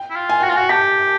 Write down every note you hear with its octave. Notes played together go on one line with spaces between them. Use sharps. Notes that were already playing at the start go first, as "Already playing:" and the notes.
Already playing: G5
E4
F4
G#5
F#4 G5
F4
F#4 G#5
G4 A5